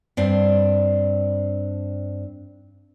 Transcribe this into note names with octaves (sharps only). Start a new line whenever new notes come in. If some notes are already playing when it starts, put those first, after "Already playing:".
G2 C4 D4